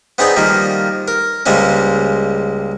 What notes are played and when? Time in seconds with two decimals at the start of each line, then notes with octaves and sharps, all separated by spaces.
0.18 B3 C4 D#4 G#4 D5 G5
0.36 D#3 F3 G3 A#3
1.08 A#4
1.46 C#2 G3 G#3 A#3 C4 C#4